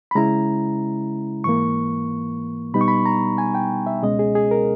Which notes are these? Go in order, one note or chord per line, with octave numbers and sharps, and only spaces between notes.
B5
C#3 G#3 C#4 E4 A#5
G#2 E3 A#3 C#6
B2 G3 B3 D#4 B5
C#6
B5
A#5
G#5
G5
E5
C#2 B2 G#3 C#4 D#5
G#4
G#4
A#4